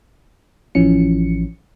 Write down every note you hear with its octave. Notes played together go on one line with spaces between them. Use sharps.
A1 E3 F3 C#4 C#7